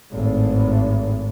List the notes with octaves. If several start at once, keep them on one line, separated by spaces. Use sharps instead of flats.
G#1 A2